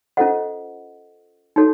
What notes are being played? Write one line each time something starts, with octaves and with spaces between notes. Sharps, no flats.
C#4 F4 A4 C5 D#5 F#5
D#4 F#4 A4 C#5